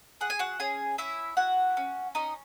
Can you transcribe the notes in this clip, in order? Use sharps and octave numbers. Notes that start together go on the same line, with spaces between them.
G#4 F#5
G#5
F#4 F#5
C#4 G#4 G#5
C#4 E4 E5
E4 F#4 F#5
C#4
C#4 D#4 D#5